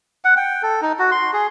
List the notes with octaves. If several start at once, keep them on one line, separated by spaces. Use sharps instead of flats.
F#5
G5
A4
D#4
F#4
C6
G#4